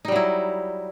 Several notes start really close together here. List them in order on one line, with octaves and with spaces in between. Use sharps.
D#4 G3 F#3 E4